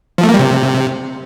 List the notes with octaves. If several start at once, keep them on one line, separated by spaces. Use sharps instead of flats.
F3
A3
A#3
G3
C3